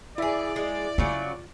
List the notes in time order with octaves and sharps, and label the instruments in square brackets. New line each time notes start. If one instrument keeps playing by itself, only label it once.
[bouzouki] E3 G#4 [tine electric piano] E4 E5 [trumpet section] D5
[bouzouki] G#3
[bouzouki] C#3 F#3 [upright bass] F4